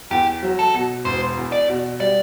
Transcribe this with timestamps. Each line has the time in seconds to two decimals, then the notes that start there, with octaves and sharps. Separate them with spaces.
0.11 E2 G4
0.43 F#3
0.59 A4
0.74 B2
1.05 E1 C5
1.37 E2
1.52 D5
1.69 B2
2.00 G3 D5